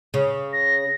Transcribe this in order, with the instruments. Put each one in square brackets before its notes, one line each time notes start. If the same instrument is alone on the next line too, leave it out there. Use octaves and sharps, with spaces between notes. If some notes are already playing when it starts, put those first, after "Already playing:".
[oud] C#3
[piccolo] A#6